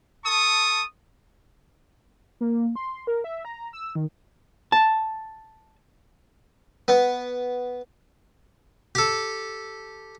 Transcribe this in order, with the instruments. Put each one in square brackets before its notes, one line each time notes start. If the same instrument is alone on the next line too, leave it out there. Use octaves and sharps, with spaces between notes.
[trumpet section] A4 A5 C#6 D#6
[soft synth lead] A#3
C6
A#4
E5
A#5
E6
D#3
[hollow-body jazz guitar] A5
[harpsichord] B3
G4 A4